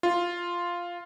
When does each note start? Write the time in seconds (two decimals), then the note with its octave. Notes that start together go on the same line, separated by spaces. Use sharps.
0.03 F4